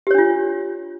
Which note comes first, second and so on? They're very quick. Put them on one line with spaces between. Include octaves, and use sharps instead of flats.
G4 C#5 D4 F4